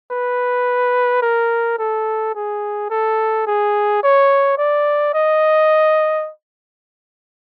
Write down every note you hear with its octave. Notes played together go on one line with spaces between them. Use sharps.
B4
A#4
A4
G#4
A4
G#4
C#5
D5
D#5